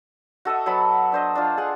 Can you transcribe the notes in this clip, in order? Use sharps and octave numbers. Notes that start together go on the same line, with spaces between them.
F#4 A4 D#5 E5
F#3 B3 A5 B5
D4 C5 D#5
D4 F4
G#4 F#5